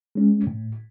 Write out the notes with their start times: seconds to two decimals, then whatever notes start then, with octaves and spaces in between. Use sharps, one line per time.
0.15 G#3 C#4
0.47 A2